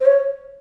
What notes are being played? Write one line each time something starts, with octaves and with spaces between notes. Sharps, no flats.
C5
C#5